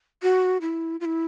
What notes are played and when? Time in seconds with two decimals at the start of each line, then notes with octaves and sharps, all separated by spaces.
0.23 F#4
0.62 E4
1.00 F4
1.05 E4